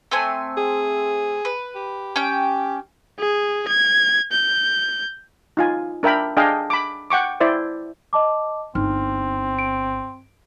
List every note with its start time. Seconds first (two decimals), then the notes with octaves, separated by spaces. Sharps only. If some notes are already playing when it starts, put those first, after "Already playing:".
0.11 A3 C4 G#5
0.57 G#4
1.45 B4
1.75 G4
2.16 C#4 G5
3.19 G#4
3.68 G#6
4.32 G6
5.57 D#4 F4 G#5
6.03 D4 A#4 E5 G5 B5
6.37 D4 G#4 D#5 F5 G5 G#5
6.70 B5 D6
7.10 F#5 G5 C#6 D6
7.40 E4 C5 D5 E5
8.13 D#5 A5 D6
8.75 G1 C4 D#4 F6
9.59 D7